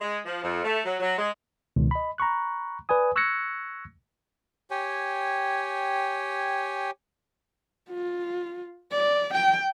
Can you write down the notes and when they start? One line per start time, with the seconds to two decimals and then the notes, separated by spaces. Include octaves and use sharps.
0.01 G#3
0.26 F3
0.43 F2
0.64 A3
0.84 F#3
1.00 F#3
1.18 G#3
1.76 C#2 B2 D#3
1.91 D#5 B5
2.18 A#5 B5 C#6 F#6
2.89 B4 D5 G#5 D#6
3.16 C#6 E6 F#6 G#6 A#6 C#7
4.71 G4 C#5 G5 G#5
7.91 F4
8.91 D5
9.34 G5